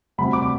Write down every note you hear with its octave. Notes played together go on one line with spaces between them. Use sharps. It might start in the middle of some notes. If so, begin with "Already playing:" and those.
D2 C3 G3 B5
D6